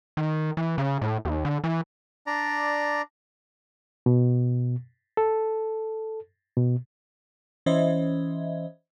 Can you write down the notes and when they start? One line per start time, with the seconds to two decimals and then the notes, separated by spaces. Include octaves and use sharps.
0.17 D#3
0.57 E3
0.78 C#3
1.02 A2
1.25 D#2
1.45 D3
1.64 E3
2.27 D4 D5 A#5
4.06 B2
5.17 A4
6.57 B2
7.66 E3 C#4 C5 D#5 E5